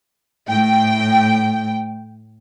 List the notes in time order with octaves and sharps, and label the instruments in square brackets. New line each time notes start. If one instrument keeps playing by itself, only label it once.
[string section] A2 G5